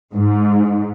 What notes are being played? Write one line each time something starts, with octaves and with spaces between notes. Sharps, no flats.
G#2